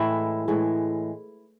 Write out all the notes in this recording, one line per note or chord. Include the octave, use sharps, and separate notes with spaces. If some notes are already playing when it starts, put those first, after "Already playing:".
Already playing: A2 E3 G#3 E4
A2 E3 G#3